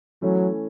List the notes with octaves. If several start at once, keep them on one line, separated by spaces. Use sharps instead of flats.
E3 F#3 A3 C#4